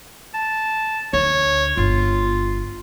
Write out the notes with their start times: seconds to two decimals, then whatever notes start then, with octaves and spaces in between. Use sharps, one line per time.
0.34 A5
1.13 D2 C#5
1.77 G1 F4